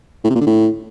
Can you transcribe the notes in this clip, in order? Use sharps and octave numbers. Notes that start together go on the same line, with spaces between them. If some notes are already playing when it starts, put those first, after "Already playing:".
A2
C3
A#2
D3
A2